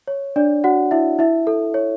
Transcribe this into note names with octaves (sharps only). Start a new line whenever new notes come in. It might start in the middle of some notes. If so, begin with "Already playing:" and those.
C#5
D4 D5
F#4 F#5
E4 E5
E4 E5
A4
C#5